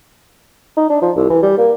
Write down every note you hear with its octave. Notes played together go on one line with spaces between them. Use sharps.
D#4
D4
F3
C2
E3
G3
A#3